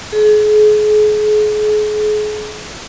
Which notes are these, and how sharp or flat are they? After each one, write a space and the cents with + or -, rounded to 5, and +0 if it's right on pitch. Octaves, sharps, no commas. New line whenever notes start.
G#4 +35